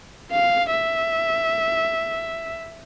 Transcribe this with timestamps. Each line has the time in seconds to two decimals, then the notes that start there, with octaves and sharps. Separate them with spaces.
0.31 F5
0.71 E5